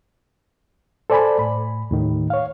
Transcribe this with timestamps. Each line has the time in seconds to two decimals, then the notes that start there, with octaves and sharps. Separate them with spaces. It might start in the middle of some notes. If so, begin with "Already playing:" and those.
1.10 A4 C5 D5 G#5 A5 B5
1.39 A2 B5
1.91 D#2 A2 D#3
2.30 C#5 F5